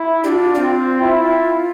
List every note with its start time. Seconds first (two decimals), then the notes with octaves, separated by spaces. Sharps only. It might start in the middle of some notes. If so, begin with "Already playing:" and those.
Already playing: E4
0.24 D4 F4 G4
0.55 C4 F4
1.01 E4